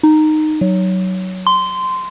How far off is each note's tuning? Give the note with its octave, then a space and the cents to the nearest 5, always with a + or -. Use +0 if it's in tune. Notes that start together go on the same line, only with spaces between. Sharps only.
D#4 -10
F#3 +10
C6 -15